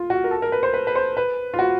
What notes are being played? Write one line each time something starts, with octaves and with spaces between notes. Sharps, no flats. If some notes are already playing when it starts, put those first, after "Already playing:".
Already playing: F4
F#4
A#4
A4
A#4
B4
C5
B4
B4
C5
B4
F4
F#4